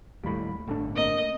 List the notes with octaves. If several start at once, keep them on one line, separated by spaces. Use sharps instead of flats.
D#2 A2 G3 B5
G1 A2 A3 D4
A#3 C4 A#4 D#5